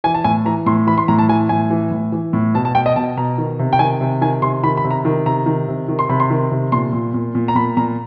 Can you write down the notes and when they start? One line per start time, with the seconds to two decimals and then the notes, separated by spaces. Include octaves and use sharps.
0.04 E3 G#5
0.14 A5
0.24 A2 G#5
0.45 E3 A#5
0.66 A2 C6
0.87 E3 B5
0.98 C6
1.08 A2 A#5
1.19 A5
1.29 E3 G#5
1.49 A2 G#5
1.70 E3
1.91 A2
2.12 E3
2.33 A2
2.55 B2 A5
2.65 A5
2.75 B2 G5
2.86 D#5
2.96 B2 A5
3.17 B2 A#5
3.38 D#3
3.59 C3
3.73 G5
3.79 D#3 G#5
4.01 C3
4.21 D#3 G#5
4.42 C3 C6
4.63 D#3 B5
4.77 B5
4.84 C3
4.91 A#5
5.05 D#3
5.26 C3 A#5
5.46 D#3
5.68 C3
5.88 D#3
5.99 C6
6.09 C3 B5
6.20 C6
6.30 D#3
6.51 C3
6.72 A#2 C6
6.93 A#2
7.14 A#2
7.35 A#2
7.48 A#5
7.55 A#2 B5
7.77 A#2 A#5